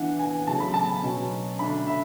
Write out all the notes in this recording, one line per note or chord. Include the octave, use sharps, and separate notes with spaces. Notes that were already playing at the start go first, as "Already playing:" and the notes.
Already playing: E3 B3 D4 F#5
G#5
C#3 F#3 A3 C#4 A5
B5
A5
B2 F#3 C#4
D3 A3 D4 B5
E5